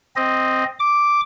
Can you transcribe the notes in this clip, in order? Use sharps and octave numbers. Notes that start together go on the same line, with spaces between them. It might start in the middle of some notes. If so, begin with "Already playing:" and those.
C4 D#5
D6